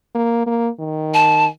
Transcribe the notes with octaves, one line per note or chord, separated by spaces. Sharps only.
A#3
A#3
D#3
A5